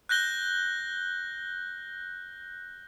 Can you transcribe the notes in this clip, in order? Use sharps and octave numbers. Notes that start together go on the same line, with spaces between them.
F#6 G6 A#6 G7